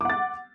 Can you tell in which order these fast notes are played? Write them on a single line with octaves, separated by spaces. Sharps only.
D6 F#5 A6